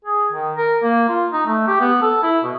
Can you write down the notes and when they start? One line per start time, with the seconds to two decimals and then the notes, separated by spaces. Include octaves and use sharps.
0.05 G#4
0.32 D#3
0.56 A#4
0.83 A#3
1.09 F4
1.32 D#4
1.46 A3
1.67 G4
1.80 B3
2.02 A4
2.23 E4
2.43 B2